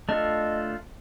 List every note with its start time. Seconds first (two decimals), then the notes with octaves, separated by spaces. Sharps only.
0.09 A3 D4 F4 A4 D#5